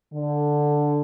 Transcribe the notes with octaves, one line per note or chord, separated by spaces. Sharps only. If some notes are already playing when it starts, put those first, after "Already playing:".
D3